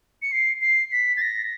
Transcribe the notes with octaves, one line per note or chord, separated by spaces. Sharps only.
C#7
C7
C7
B6
A6
A#6